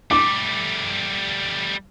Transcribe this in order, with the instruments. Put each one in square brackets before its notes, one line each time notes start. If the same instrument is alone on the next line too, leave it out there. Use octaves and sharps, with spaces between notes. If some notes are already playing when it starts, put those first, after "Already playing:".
[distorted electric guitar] G3 A3 [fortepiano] D6